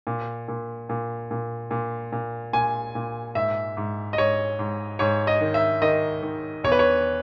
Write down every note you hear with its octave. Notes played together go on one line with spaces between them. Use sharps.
A#2
A#2
A#2
A#2
A#2
A#2
A#2 G#5
A#2
G#2 E5
G#2
D#5
G#2 C#5
G#2
G#2 C#5
D#5
D#3
E5
D#3 D#5
D#3
E2 C#5
B4
C#5